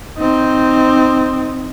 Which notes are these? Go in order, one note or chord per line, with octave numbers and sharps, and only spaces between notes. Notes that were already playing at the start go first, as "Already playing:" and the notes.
C4 D#4